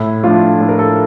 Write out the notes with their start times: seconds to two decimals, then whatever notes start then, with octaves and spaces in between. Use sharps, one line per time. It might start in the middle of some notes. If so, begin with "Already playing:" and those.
Already playing: A2 E4
0.24 F3 A3 D4 F4
0.60 A2
0.69 A#4
0.79 A4